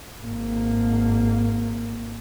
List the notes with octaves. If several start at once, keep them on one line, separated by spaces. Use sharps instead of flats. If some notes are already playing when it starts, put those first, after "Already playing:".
G#1 A#3